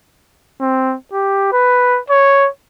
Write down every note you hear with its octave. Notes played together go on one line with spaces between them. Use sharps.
C4
G4
B4
C#5